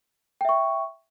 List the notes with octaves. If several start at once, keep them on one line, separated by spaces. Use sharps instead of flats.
E5 G5 C#6